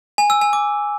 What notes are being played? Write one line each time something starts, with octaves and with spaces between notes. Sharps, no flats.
G#5
E6
G#5
D6